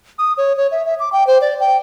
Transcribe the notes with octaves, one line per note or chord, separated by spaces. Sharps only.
D#6
C#5
C#5
E5
E5
D6
G5
C5
D5
G5